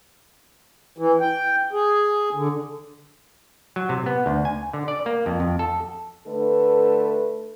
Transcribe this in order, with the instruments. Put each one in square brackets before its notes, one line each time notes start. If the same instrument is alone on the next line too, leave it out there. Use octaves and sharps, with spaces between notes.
[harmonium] E3
G5
G#4
D3
[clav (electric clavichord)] F#3
C3
B3
D2
G#5
D3
D5
A#3
F2
F2
A4
[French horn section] D3 A3 A4 B4